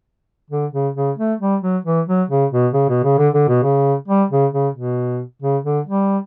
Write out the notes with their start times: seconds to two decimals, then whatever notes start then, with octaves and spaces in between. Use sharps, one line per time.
0.50 D3
0.73 C#3
0.96 C#3
1.18 A3
1.41 G3
1.62 F#3
1.85 E3
2.07 F#3
2.30 C#3
2.52 B2
2.74 C#3
2.89 B2
3.04 C#3
3.18 D3
3.34 D3
3.49 B2
3.63 C#3
4.08 G3
4.31 C#3
4.53 C#3
4.75 B2
5.42 C#3
5.64 D3
5.87 G3